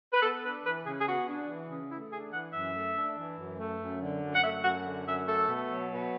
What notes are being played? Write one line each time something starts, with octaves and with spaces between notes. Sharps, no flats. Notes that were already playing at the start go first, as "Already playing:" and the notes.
B4
B3 A4
D4 B4
E3 B4
C#3 G#4
G#4
B3 F#4
D4
E3
C#3
A3 E4
D4 G#4
E3 F#5
F#2 E5
A3
D4
E3
F#2
A3
F#2
D3
F#2
F#5
A3 E5
F#2 F#5
D3
F#2 E5
A3 A4
B2
F#3
B2